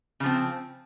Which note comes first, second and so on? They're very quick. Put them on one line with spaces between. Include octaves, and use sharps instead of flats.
C#3 F3 C4